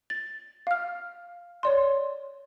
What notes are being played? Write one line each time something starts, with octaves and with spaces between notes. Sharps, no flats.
A6
F5 F6
C#5 D5 C6